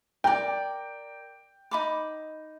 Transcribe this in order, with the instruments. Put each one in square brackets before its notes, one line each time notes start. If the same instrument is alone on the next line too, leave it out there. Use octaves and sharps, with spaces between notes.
[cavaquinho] A#4 D5 [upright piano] G5
[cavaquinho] D#4 B5 D6